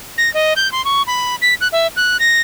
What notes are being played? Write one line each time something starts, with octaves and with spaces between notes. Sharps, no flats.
A#6
D#5
G6
C6
C#6
B5
B6
F#6
E5
F#6
A#6